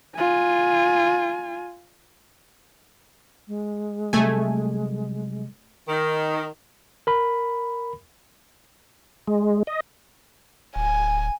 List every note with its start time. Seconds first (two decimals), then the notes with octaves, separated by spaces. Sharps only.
0.16 F4 G#5
3.48 G#3
4.13 C3 F#3 G3 A3 G#5
5.88 D#3
7.07 A#4 B5
9.27 G#3
9.67 D#5
10.76 D1 G#5